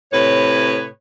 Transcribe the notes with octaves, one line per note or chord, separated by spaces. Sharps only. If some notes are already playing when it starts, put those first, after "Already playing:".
A2 C3 B4 C#5